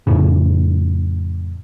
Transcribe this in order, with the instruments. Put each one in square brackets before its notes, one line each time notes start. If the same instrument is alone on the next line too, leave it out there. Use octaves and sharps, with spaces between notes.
[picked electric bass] F2 A2 C#3